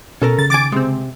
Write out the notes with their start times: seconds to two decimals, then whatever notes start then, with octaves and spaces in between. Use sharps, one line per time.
0.22 B2 C#4 A4 A#4
0.39 C#3 A6
0.50 D#3 G#5 D6 A6 D7
0.72 C3 G#3 C4